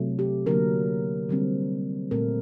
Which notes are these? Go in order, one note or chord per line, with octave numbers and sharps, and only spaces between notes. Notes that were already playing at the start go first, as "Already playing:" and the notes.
Already playing: C3 F#3 A3
G4
D3 F#3 A#3 A#4
D3 G3 C4
A#2 A3 C4 A#4